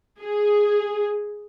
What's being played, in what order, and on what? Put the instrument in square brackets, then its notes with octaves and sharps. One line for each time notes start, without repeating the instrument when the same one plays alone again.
[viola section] G#4